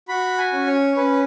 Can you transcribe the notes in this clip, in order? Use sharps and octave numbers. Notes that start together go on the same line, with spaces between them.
F#4 B5
G#5
C#4
C#5
C#4 B4